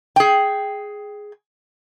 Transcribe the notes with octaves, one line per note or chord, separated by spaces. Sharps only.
G#4 G5